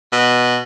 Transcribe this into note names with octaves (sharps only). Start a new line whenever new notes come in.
B2